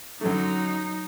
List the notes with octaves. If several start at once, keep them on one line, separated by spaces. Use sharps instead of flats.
F#2 D3 F#3 A3 D#4